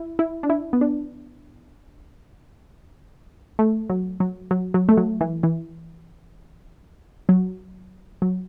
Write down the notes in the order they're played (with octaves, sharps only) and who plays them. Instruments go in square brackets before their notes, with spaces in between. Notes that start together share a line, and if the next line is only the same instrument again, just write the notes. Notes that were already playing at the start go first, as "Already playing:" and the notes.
Already playing: [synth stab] E4
E4
D4
E4
B3
D4
A3
F#3
F#3
F#3
F#3
A3
F#3
E3
E3
F#3
F#3